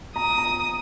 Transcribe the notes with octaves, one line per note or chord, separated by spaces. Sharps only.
A#5 D#6
A#5